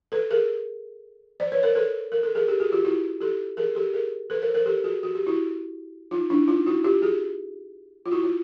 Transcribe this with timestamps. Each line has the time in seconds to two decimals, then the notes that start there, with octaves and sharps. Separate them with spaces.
0.12 A4 B4
0.31 G#4 A#4
1.40 C5 D5
1.52 B4 C#5
1.63 A#4 C5
1.75 A4 B4
2.12 A#4
2.23 A4
2.35 G#4 A#4
2.48 G4 A4
2.60 F#4 G#4
2.72 F4 G4
2.85 E4 F#4
3.21 G4 A4
3.57 G#4 A#4
3.75 G4 A4
3.94 G#4 A#4
4.30 A4 B4
4.42 A#4 C5
4.54 A#4 C5
4.66 G4 A4
4.84 F#4 G#4
5.03 F#4
5.15 G4
5.27 E4 F#4
6.11 D#4 F4
6.30 D4 E4
6.48 D#4 F4
6.66 E4 F#4
6.84 F4 G4
7.02 F#4 G#4
8.06 F4
8.12 E4 F#4
8.23 F4